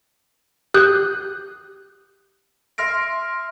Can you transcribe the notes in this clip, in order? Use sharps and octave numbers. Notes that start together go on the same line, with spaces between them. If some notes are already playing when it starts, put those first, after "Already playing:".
G4 D#6 F#6 G6
E5 C6 F6 A#6 D7